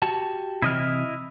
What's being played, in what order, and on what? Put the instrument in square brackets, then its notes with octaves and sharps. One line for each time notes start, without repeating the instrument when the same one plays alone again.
[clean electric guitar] F#4 G4 A5
[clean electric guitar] C3 E3 [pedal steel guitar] E4 D#5 F6